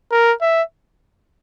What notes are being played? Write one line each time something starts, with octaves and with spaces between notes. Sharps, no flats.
A#4
E5